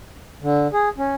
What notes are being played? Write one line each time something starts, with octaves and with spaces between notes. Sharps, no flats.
D3
G#4
C#4